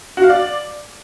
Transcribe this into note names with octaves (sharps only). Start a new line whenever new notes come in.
F#4
F5
D5